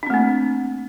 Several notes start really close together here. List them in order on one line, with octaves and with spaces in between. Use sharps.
D4 C4 A3 A#3